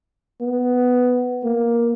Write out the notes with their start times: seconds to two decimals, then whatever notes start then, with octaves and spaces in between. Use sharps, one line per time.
0.41 B3
1.44 A#3